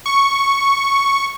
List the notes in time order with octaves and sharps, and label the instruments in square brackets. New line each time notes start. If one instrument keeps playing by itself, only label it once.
[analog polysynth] C#6